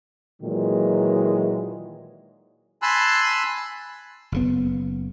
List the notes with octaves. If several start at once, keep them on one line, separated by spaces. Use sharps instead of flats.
A#2 D#3 E3 F#3 G#3
G#5 A5 B5 C6 E6 F#6
F#1 C#3 B3